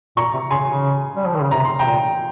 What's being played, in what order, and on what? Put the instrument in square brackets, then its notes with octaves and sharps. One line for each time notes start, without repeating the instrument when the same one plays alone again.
[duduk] A#2 [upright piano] A#5 C#6
[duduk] C3
[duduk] C#3 [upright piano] G#5 C6
[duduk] C#3
G3
F3
D#3
C#3
[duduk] C3 [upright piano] A#5
[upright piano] C6
[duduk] C3 [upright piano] G5 A#5
[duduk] A#2